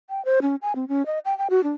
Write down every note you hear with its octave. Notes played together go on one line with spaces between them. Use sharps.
G5
C5
C#4
G#5
C4
C#4
D#5
G5
G5
F#4
D4